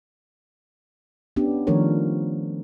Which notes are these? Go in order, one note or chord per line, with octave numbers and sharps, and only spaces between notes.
B3 C#4 D4 G4
D#3 F3 A3 D4 A#4 C#5